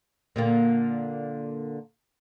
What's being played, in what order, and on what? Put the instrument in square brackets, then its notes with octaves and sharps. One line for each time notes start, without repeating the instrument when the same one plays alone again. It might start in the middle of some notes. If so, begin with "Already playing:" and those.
[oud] A#2 D3 A#3